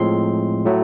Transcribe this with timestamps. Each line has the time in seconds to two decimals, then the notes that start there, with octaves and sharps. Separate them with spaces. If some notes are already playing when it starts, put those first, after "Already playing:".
Already playing: A2 F3 G#3 C4 C6
0.66 A2 F#3 A3